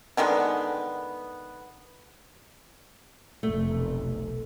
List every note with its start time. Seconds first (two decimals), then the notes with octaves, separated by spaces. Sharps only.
0.17 D3 D#3 G#3 B3
3.43 F1 B1 A3